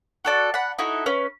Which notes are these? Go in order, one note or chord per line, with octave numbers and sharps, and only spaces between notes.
F#4 A4 D5 F#5
F#5 B5
D#4 E4 F#4 A4
C#4 B4